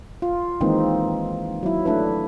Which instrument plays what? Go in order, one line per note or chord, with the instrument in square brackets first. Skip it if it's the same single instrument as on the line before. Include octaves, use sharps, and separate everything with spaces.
[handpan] F4
D#3 E3 G#3 A#3 C4 D#4
F#3 E4
A3 D4 E4 B4